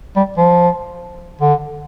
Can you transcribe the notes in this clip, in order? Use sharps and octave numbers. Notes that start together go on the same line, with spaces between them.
G3
F3
D3